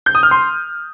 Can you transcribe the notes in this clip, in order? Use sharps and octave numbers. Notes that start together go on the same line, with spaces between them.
G6
D#6
F6
C6